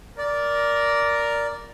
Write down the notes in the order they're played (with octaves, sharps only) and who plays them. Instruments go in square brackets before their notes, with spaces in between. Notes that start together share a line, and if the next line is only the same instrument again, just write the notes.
[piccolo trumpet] A#4 [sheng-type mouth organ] D5